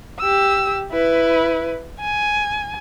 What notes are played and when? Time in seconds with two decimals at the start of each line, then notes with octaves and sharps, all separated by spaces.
0.20 G4 E6
0.92 E4 B4
2.00 G#5